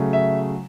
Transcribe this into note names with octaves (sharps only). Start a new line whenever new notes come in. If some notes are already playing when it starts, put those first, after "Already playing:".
Already playing: C#3 F#3 A3
E5